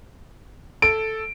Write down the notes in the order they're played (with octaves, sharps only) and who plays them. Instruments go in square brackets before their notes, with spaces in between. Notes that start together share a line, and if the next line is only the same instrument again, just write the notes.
[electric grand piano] A4 [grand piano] D7